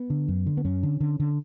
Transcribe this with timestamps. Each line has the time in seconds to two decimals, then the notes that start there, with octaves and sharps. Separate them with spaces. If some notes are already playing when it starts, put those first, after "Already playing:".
Already playing: B3
0.10 D3
0.28 F#2
0.46 D3
0.57 B3
0.65 F#2 C#4
0.83 D3
1.00 D3
1.20 D3